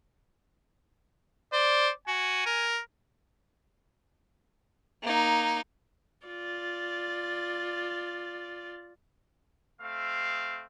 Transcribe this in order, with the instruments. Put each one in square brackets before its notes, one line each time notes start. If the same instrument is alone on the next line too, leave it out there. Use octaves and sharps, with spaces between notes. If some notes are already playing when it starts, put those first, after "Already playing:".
[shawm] C5 [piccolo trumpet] D5
[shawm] F#4 [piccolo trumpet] G#5
[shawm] A#4
[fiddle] A#3 D#4
[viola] F4 D5
[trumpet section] A3 C4 F5